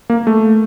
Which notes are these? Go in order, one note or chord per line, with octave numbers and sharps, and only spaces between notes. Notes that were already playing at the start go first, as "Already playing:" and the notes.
A#3
A3